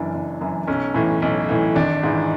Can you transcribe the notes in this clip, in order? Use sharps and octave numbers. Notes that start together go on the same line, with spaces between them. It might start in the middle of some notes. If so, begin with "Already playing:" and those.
Already playing: F#1 F#2 E3 D4
F#1
F#2 E3
B1 C#4
A2 E3
B1
A2 E3
G#1 D4
G#2 E3